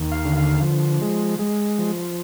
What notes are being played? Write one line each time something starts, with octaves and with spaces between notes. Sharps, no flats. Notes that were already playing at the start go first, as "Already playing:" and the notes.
Already playing: D#2
F5
D3
F5
F3
G#3
G#3
F3